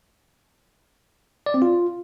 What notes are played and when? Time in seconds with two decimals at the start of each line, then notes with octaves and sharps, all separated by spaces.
1.46 D5
1.54 C4
1.62 F4